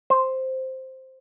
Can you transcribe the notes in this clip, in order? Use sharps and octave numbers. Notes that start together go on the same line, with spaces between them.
C5